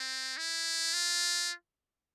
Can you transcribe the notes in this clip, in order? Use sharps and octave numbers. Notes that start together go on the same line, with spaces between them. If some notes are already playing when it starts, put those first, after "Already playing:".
Already playing: C4
E4
F4